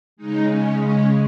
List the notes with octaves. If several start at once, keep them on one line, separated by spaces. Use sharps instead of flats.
C#3 G#3 D#4
C#4
C#4